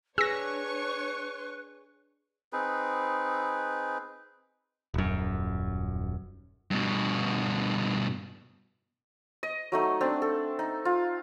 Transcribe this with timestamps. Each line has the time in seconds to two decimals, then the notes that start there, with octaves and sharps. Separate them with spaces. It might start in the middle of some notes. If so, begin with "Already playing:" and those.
0.18 D4 G#4 B4 C#5 C#6 E6 A#6
2.53 C4 D#4 G#4 B4
4.94 D#1 F#2
6.71 G2 B2
9.43 D#5
9.72 F#3 A3 D#4
10.01 C4 D4
10.22 A4
10.59 D#4
10.85 F4